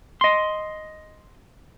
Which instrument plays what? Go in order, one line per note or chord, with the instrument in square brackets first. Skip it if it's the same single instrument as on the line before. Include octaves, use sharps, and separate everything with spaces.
[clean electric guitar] D#5 C6